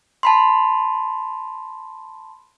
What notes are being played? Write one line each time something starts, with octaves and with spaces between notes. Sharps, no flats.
A5 B5 C6